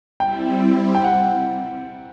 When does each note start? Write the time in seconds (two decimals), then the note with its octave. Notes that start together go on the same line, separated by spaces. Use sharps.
0.20 G3 C4 E4 G5
0.95 G5
1.04 F#5